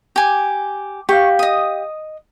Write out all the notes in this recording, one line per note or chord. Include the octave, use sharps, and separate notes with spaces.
G4 G#5
G4 F5 C#6
D#5 D#6